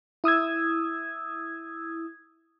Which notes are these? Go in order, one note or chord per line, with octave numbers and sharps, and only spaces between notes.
E4 D#6 E6 G#6